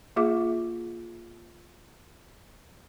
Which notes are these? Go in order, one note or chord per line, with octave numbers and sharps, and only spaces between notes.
A#3 F4 G#4 E5 D6